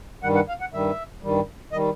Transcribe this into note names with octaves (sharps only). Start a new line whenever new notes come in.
G2 D#3 G3 F#5
F#5
F5
F#5
G2 D#3 G3 E5
G2 D#3 G3
D#3 G3 D#5